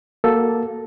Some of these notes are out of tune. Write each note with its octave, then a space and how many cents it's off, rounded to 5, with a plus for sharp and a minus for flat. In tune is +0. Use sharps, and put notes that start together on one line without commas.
A#3 +0 F#4 +0 A4 +0